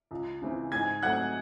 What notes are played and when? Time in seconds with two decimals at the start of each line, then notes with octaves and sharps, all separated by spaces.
0.11 C#2
0.42 C#3 E3 C4
0.72 G#2 G#5 G#6
1.03 F#3 A3 C4 F#5 F#6